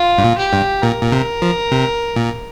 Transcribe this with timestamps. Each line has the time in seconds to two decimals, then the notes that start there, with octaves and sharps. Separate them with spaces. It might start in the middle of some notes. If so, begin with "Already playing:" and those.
Already playing: F4
0.18 G2
0.24 A#2
0.38 G4
0.53 G2
0.82 A#2 A#4
1.03 A#2
1.12 C3
1.42 F3
1.71 C3
2.16 A#2